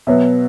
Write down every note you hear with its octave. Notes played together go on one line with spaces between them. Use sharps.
B2 F#3 B3 E5